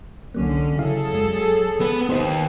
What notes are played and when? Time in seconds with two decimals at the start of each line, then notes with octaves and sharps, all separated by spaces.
0.34 C2 D3 F#3 A#3 C#4
0.79 C#3 F#3 E4 G#4 A4 F5
1.13 F#2 G#3
1.81 B3
2.09 D#2 D#4 B4 C5